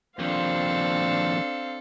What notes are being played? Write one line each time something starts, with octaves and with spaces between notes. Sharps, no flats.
D#2 F3 C4 D4 A4 F5